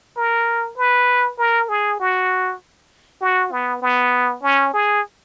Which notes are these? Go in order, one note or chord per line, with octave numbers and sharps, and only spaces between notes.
A#4
B4
A#4
G#4
F#4
F#4
B3
B3
C#4
G#4